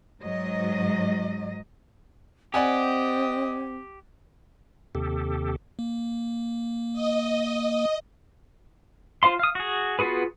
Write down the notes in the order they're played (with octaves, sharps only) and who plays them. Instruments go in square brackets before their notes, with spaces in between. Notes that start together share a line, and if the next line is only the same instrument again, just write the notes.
[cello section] G#2 F#3 D#5
[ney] C4 [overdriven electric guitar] G4 [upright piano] D5 F#5 G#5 [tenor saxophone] D#5
[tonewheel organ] D#2 C3 G4 A4
[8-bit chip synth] A#3
[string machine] D#5
[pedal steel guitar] F4 C5 F5 C6
F5 D#6
F#4 G#4
B3 F4 F#4 G#4 B4